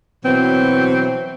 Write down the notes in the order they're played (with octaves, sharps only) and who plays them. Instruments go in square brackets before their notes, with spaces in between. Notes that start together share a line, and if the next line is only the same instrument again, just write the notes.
[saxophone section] B2 E3 F#3 C4